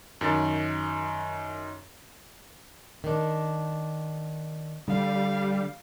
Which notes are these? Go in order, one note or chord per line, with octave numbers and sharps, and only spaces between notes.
F#2 D#3 A6
D#3 D4
D3 G3 F5